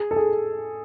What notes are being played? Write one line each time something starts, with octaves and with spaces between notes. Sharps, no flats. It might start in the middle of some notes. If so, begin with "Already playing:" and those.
Already playing: G#4
A4
G#4